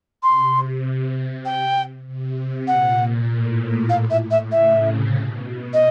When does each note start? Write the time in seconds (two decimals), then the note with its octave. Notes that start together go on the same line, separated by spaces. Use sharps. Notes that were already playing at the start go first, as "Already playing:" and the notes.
0.23 C3 C6
0.84 C3
1.45 G5
2.07 C3
2.68 A#2 F#5
3.29 A2
3.90 A2 F5
4.10 E5
4.21 A2
4.31 E5
4.52 C#3 E5
4.82 C3
5.12 B2
5.74 D#5